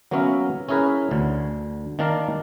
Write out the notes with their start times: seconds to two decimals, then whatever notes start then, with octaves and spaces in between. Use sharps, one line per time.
0.11 F#3 A#3 B3 C#4 A#4 E5
0.69 C#4 E4 G#4 A#4 B4
1.11 D2 D3
1.99 D#3 A#3 D4 D5 F5 A#5